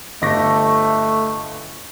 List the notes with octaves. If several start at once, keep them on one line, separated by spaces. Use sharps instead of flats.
G1 A3 D#5 C#6 D6 G6 A#6